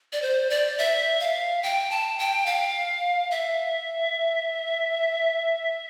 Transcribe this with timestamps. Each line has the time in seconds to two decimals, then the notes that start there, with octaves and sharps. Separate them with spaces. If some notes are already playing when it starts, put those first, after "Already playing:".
0.12 D5
0.22 C5
0.50 D5
0.78 E5
1.20 F5
1.63 G5
1.91 A5
2.19 G5
2.46 F5
3.31 E5